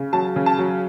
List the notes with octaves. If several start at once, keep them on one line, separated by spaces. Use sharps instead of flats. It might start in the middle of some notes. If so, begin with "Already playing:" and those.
Already playing: C#3
F#3 A5
C#3
A5
F#3